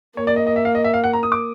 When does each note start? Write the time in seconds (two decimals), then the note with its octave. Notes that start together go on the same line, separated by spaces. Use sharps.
0.17 A#3 C#5
0.27 D5
0.36 D#5
0.47 D#5
0.56 E5
0.65 F5
0.75 D#5
0.84 E5
0.94 F5
1.04 F#5
1.13 A#5
1.23 D#6
1.32 D6